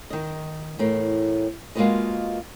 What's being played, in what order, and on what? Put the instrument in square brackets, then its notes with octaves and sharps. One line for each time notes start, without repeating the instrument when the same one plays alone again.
[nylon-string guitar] D#3 D#5
E2 A2 A#4
G#3 A#3 F4 F#4 B4 D#5